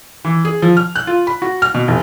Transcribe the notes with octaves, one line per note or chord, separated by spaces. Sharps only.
E3
G#4
F3
F6
F#6
F4
B5
F#4
F6
B2
F1